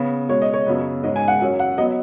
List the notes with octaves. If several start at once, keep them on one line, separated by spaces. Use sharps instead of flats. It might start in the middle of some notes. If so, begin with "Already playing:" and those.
Already playing: C#3 B3
B2 G#3 C#4 C#5
D#5
C#5
F#2 C#3 B3
G#2 G#3 C#4 D#5
G#5
F#5
F#2 F#3 C#4
F#5
F#3 B3 D#5